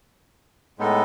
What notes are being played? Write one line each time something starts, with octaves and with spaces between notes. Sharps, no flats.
A2 G#3 B3 D#4 A4